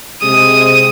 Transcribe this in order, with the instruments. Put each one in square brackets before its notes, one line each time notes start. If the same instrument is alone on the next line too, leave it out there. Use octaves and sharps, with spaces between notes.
[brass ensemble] C3 G#3 [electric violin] D#6